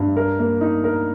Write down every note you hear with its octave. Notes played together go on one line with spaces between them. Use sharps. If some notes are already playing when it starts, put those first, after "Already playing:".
Already playing: G2
A#4
A#3
D#4
A#4